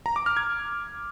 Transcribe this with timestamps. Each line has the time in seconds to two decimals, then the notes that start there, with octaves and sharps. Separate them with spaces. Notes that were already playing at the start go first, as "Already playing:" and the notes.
0.06 A#5
0.16 D6
0.26 F6
0.37 G#6